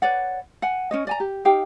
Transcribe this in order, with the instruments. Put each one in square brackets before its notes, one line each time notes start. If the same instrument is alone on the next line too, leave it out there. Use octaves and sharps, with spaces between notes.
[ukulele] B4 C#5 D5 F#5
F#5 G#5
C#4 C#5 D#5
D5 G#5 A#5
G4
D#4 G4 F5 G5